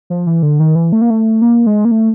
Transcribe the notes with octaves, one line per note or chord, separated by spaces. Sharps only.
F3
E3
D3
D#3
E3
A3
A#3
A3
A#3
G#3
A#3
A3